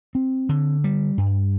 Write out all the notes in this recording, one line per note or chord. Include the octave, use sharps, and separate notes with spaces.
C4
D3
G3
G2